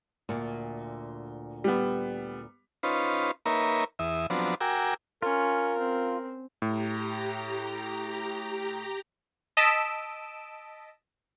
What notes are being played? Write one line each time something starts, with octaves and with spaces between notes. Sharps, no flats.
D2 A#2
G3 B3
C#4 D#4 F4 B4 C5
A#3 D#4 A#4 B4 C#5 E5
E2 E5 D#6
F3 F#3 B3 C4 D4
F#4 A#4 G5 G#5 D6 E6
C#4 F4 A#4
C4
A2 G4 A#5
D#5 A5 E6 B6 D7